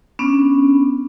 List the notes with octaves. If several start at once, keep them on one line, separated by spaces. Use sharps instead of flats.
B3 C#4 D4